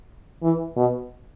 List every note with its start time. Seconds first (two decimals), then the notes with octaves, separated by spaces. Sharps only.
0.43 E3
0.77 B2